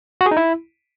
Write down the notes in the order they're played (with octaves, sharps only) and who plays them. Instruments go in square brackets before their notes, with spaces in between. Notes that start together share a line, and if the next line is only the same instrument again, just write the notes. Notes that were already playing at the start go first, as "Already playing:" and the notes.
[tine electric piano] F#4
G#4
D#4
E4